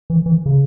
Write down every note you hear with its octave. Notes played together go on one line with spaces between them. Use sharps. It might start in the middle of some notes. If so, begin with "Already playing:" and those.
E3
E3
C#3